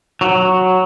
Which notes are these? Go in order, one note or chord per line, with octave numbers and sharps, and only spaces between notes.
F#3